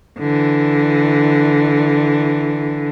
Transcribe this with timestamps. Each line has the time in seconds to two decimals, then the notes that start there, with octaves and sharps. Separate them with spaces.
0.19 D3 E3